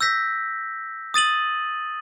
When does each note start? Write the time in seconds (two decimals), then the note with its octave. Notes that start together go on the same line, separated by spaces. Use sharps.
0.01 E6 G6 A#6 B6
1.14 D#6 A6 D#7 F#7